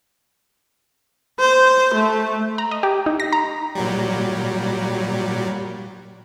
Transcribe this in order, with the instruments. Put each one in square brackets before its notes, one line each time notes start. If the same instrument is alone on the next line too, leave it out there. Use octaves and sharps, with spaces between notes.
[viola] C5
A3
[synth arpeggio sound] A#5
D#5
G4
D#4
A#6
A#5
[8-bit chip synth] A#2 F#3 G3